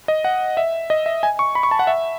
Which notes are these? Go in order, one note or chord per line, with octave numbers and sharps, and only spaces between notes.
D#5
F#5
E5
D#5
E5
G#5
C#6
B5
C#6
A5
F#5
E5